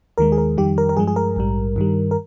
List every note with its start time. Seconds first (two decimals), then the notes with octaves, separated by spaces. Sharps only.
0.18 D#2 D#3 G#3 A#4
0.32 G#4
0.38 A#4
0.58 F2 D#3 G3 G4
0.78 A#4
0.89 A#4
0.97 G2 F3 G#3 G#4
1.08 G#4
1.16 A#4
1.36 A#1 G#2 G3
1.76 G2 D#3 G3
2.11 A#4